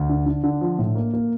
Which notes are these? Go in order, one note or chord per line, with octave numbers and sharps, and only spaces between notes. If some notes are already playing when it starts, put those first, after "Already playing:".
Already playing: D2
D3
D3
D3
F3
A2
A#3
A#3